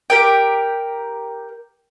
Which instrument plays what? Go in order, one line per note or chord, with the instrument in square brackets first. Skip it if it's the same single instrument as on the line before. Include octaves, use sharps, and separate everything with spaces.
[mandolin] G4 A#4 G5